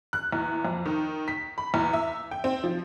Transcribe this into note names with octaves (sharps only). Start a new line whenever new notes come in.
F#6
E2
F2
D#3
B6
B5
E2
E5
G5
C4
F3